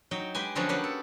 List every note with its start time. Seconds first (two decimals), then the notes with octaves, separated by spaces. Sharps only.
0.11 F#3 D#4 G5
0.35 G#3 G4 B4 G5 G#5
0.55 D3 F3 F#3 B3 C#4 D4
0.69 A#3 B3 C#4 G4 B4 F#5
0.84 A4